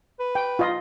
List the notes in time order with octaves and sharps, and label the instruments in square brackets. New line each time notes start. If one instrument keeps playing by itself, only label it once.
[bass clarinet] B4
[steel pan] G5
F4 D#5